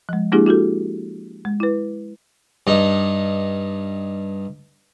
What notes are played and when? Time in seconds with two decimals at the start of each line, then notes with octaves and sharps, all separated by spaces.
0.09 F3 G#3
0.32 G#3 A#3 D4 E4 G4 G#4
0.46 E4 F#4 G4 A4
1.45 G#3
1.60 E4 B4
2.67 G2 D#4